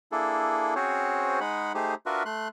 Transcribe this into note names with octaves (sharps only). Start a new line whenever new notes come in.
A#3 D4 E4 G#4 A4
C4 C#4 F#4 G#4 C5 C#5
G#3 D#4 G#4 F#5 B5
A3 D#4 G4 G#4 C5
D4 F4 F#4 A#4 B4 E5
A3 C6 F#6